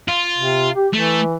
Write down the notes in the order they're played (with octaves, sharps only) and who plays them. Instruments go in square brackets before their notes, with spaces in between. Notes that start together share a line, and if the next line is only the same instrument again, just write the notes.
[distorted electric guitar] F4
[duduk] C3
G4
[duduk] E3 [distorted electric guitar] A3